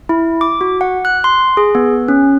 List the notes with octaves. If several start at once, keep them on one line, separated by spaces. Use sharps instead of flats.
E4
D6
F#4
F#5
F#6
C6
G#4
B3
C#4